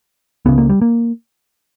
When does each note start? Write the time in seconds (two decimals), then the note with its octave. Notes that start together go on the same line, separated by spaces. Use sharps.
0.46 C#2 C#3 B3
0.58 A#3
0.69 G3
0.82 A#3